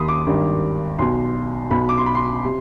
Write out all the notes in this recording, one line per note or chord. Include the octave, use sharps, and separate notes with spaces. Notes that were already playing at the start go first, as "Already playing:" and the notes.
Already playing: D#2 D#3 B5 C6 D#6
D6
G#1 G2 D#3
B1 B2 C6
B1 B2 B5
D6
C6
B5
C6
C3